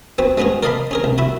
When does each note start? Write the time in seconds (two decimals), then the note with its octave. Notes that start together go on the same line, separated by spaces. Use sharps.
0.18 B3 C4 F#4
0.38 G#3 B3 C#4 F#4 G#4
0.63 A#4 D5 D#5 F5 A5 B5
0.91 C#4 G#4 A#4
1.04 C2
1.18 E4 F#4 B5